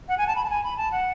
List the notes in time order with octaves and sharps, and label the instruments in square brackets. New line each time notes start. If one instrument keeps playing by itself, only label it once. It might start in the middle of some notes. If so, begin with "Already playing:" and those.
[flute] F#5
G#5
A5
B5
A5
G#5
B5
A5
F#5